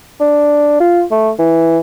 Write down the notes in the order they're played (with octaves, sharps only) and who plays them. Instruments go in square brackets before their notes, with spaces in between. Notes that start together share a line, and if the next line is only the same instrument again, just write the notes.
[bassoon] D4
F4
A3
E3